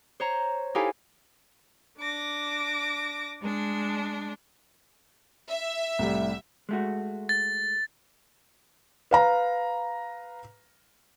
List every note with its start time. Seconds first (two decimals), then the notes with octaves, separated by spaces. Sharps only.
0.20 C5 C#5 A#5
0.75 D#4 E4 G4 A4 F5 G#5
1.98 D4 D6 A#6
3.42 G#3 D4
5.48 E5
5.99 C2 A2 G3
6.69 G#3 A3 F#4
7.29 A6
9.11 B4 F5 A#5